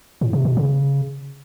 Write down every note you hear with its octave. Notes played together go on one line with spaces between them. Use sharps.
A2
C3
B2
C#3